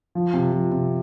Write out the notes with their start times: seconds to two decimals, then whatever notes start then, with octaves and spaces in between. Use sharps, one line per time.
0.15 F3
0.34 C3
0.53 F3
0.72 C3